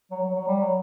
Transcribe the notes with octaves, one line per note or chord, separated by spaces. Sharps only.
F#3
F#3
F#3
G3
F#3